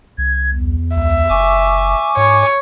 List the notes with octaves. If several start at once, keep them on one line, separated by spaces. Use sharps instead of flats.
C2 G#6
E2
C#2 E5
F#1 G#5 C#6 D6
G#2 C#5